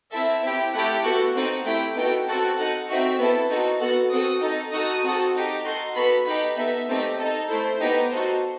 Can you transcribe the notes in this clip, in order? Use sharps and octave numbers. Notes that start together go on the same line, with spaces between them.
C4 E4 A4 E5
C4 E4 G4
A3 E4 G4 F#5
B3 F#4 A4 F#5
C4 D#4 A4 F#5
A3 E4 G4 G5
B3 D#4 F#4 A4 G5
C4 F#4 A4
D#4 A4 F#5
C4 D#4 F#4 E5
B3 E4 A4
C4 D#4 F#4 A4
B3 F#4 A4 F#5
C4 F#4 A4 D#6
D#4 A4
D#4 F#4 A4 D#6
C4 F#4 A4
D#4 G4
D#4 F#4 A4 C6
B3 F#4 A4 B5
D#4 G4 B5
B3 D#4 A4 E5
A3 C4 D#4 G4
D#4 A4 D#5
A3 E4 A4 C5
B3 D#4 G4
D#4 F#4 A4 C5